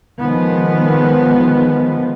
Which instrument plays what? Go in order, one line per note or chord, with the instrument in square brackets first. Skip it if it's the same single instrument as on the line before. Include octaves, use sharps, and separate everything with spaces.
[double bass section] D#3 F3 G#3 B3